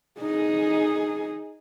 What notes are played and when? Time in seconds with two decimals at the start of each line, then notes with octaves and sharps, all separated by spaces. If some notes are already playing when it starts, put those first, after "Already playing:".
0.21 D#4 G#4